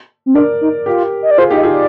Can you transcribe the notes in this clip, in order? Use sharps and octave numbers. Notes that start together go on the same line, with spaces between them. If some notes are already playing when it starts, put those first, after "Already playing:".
C4
D4 A#4 D5
D#4
F4 G4 A#4
D#5
D5
F4 G#4 C5
D#4 G4
D#5
F4 G#4
D5